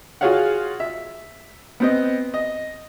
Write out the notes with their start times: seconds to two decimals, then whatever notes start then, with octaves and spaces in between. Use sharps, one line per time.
0.21 F4 F#4 G#4 C#5 F5 F#5
0.80 E5
1.80 B3 C4 D#5
2.34 D#5